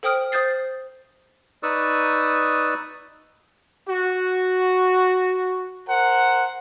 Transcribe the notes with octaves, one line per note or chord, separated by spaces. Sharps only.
A4 C5 G5 D#6 F6 D7
C5 D#6 G6 A6 C7
D#4 B4 D5 C#6 D#6 E6
F#4
A#4 C5 F#5